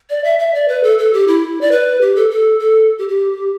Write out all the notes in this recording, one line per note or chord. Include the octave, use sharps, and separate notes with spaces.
D5
E5
E5
D5
B4
A4
A4
G4
E4
D5
B4
G4
A4
A4
A4
G4
G4